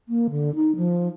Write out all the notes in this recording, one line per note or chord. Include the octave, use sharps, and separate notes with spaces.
A#3
D3
D#4
F3